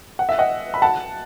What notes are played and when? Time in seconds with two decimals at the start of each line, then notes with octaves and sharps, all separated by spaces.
0.19 F#5
0.29 E5
0.39 D#5 F#5
0.74 B5
0.82 F#5 A5